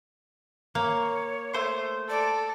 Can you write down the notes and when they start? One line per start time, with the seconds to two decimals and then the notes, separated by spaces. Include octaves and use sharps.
0.75 A#3 C#5
1.53 A3 C5 C6
2.10 A4 D5